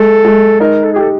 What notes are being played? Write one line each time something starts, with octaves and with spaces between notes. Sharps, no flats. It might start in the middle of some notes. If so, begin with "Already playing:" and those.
Already playing: G#3 A4
G#3
D#4 A#4
A4
G#4
G4 A4